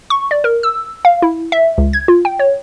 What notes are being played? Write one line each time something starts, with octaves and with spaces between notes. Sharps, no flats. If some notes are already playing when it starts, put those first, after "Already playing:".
C#6
D5
A#4
E6
F5
E4
E5
C#2
G#6
F4
G5
C#5